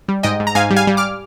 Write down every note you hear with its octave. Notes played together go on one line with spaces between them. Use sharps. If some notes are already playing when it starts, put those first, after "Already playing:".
G3
G#2 D#5 G5
G#2
A#5
G#2 F5 G#5
G3
F5 G#5
G3
D6 F6